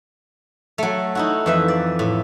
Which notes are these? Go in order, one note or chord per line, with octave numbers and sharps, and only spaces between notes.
F#3 A3
D#4 E4 F#4
F2 E3 E5
D5
A2